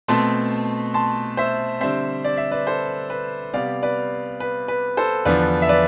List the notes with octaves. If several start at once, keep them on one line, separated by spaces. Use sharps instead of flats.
B2 A3 C4 A5 C6
A5 C6
C5 E5
D3 G3 C4 C5 E5
D5
E5
B4 D5
A4 C5
B4
C3 G3 B3 D5 F5
B4 D5
B4
B4
A4 C5
E2 D3 F3 B4 D5
E5
B4 D5